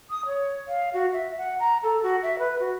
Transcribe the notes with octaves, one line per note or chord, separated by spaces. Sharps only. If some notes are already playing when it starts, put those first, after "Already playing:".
D#6
C#5
F5
F#4
E5
F#5
A#5
A4
F#4
E5
B4
F#4